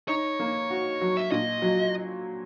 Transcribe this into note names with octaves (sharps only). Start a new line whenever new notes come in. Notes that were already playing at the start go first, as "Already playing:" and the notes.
D#4 C#5
A#3
F#4
F#3
E5
A#2 D#5
F#3